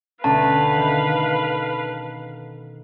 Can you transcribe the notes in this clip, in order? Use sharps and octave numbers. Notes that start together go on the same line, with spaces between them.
D2 B2 C#4 B4 F5 A5
D#3